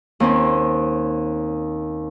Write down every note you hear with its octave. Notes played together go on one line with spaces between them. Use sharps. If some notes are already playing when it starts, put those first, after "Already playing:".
D#2 C4 C#4